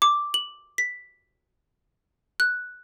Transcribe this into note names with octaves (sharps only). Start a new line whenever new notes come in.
D6
F#7
B6
F#6